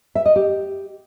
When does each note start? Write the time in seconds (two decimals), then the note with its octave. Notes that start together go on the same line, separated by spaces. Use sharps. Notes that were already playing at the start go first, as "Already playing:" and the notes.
0.15 E5
0.26 D#5
0.36 G4